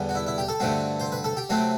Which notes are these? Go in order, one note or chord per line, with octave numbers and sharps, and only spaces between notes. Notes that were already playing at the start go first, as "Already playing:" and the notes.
Already playing: E2 D3 G3 B3
F#4
E4
E4
G4
A4
G2 D3 A3 C4 F#4
C5
B4
A4
G4
C3 F#3 A3 C4 F#4